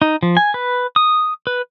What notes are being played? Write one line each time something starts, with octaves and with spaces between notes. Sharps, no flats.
D#4
F3
G#5
B4
D#6
B4